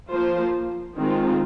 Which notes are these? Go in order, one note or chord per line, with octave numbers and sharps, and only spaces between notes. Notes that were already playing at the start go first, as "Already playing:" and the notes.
F3 A#3 F4 C5
D#3 G#3 C4 F4